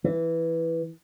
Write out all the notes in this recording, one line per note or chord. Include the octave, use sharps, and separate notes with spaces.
E3